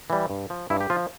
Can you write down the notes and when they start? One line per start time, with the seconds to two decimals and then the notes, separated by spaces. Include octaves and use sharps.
0.10 E3 G3
0.30 G2
0.50 F3
0.70 G2 E4
0.81 G4
0.90 F3 F4